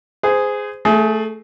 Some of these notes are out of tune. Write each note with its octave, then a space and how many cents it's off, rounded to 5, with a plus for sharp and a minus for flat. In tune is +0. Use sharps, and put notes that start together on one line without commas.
G#4 +0 C5 -30
A3 +0 G#4 +25